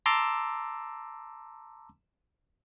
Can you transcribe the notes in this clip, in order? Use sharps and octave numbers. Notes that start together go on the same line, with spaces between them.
A5 A#5 C6 D6 E6